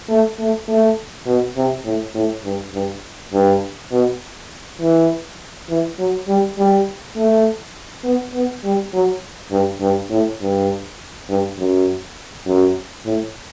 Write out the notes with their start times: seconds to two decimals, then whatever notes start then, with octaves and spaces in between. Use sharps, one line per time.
0.09 A3
0.39 A3
0.69 A3
1.26 B2
1.57 C3
1.85 A2
2.15 A2
2.44 G2
2.74 G2
3.33 G2
3.92 B2
4.81 E3
5.69 E3
5.99 F#3
6.28 G3
6.58 G3
7.17 A3
8.04 B3
8.34 B3
8.64 G3
8.93 F#3
9.51 G2
9.81 G2
10.11 A2
10.41 G2
11.29 G2
11.58 F#2
12.46 F#2
13.06 A2